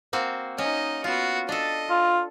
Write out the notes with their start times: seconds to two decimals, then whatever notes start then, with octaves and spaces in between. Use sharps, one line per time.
0.13 A#3 C4 F#4
0.58 C#4 D#4 D#5
1.04 B3 F4 F#4
1.49 D4 A4 D#5
1.90 F4